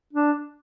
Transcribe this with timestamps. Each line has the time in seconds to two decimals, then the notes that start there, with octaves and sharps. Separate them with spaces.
0.13 D4